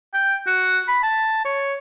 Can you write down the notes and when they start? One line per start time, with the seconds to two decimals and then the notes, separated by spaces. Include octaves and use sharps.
0.14 G5
0.47 F#4
0.88 B5
1.03 A5
1.45 C#5